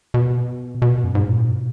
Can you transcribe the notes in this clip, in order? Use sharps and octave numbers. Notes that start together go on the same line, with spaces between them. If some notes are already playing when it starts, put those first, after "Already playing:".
B2
B2
F#2
G#2
A#2
B2